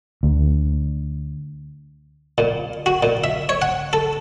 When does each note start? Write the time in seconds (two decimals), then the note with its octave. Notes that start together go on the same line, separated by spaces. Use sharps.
0.23 D2
2.38 A#2
2.86 F#4
3.03 A#2
3.24 E5
3.49 C#5
3.62 F#5
3.93 A4